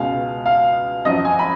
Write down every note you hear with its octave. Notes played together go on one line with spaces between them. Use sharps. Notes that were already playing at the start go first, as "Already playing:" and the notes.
Already playing: C#2 B2 G#3 F5
F5
G#1 F#2 F3 D#5
G#5
B5